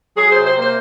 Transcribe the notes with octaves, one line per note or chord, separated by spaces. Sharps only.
F#3 G#4
C3 C5
C5
A#3 C5